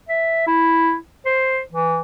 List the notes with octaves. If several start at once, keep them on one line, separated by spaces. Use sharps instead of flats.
E5
E4
C5
E3